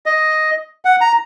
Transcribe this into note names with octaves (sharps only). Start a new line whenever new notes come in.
D#5
F#5
A#5